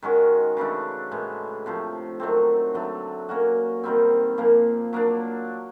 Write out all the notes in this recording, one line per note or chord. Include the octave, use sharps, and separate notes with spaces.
D#3 G#3 C#4 F#4
C#3 E3 A3 D4
A2 E3 G#3
C3 F3 A3
D#3 F#3 A3 C4
D3 F#3 A3
A#3 C#4 F#4
C3 D#3 G3 C4
A#2 F3 A#3
F#3 A#3 D4